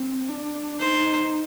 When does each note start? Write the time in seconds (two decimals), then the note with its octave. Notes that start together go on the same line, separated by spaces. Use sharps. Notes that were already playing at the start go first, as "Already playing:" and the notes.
Already playing: C4
0.29 D4
0.80 D#4 C5